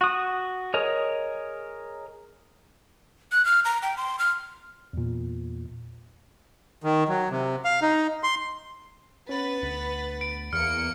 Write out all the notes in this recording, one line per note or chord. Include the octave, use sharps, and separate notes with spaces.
F#4 D#6
G#4 A#4 C#5 D#5
F#6
F6
A#5
G5
C6
F6
E2 A#2
D#3
F#3
C3
F5
D#4
C6
B3 C#4 B4 A6
D2
D7
E2 A#3 F6 C#7